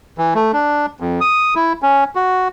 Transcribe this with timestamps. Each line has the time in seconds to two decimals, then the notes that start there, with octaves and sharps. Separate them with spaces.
0.18 E3
0.35 A3
0.53 D4
1.00 F2
1.21 D#6
1.55 E4
1.82 C#4
2.15 F#4